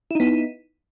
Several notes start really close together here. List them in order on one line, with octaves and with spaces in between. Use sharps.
E4 D#4 B3